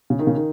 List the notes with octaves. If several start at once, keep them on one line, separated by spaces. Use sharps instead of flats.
C#3
D#3
C#3
D#3